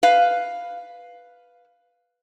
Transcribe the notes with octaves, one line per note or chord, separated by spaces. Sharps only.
B4 F5